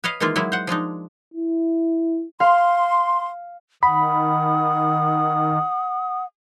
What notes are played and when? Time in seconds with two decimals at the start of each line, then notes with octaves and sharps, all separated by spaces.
0.04 B4 C#5 D#5 F5
0.20 D#3 E3 G#3 A#3 F4
0.36 F#3 G#3 A#3 E4
0.52 C5 F#5
0.67 F3 G#3 D4 D#4
1.34 E4
2.40 F5 C6
3.83 D#3 F#5 B5 D#6